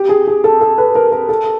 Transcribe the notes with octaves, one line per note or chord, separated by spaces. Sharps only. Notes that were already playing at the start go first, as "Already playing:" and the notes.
Already playing: G4
G#4
G#4
A4
A4
B4
A#4
A#4
A4